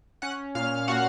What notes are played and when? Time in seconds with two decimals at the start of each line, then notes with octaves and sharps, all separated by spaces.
0.22 C#4 F#5 F#6
0.55 A#2 F5 F6
0.88 A#2 F#4 F#5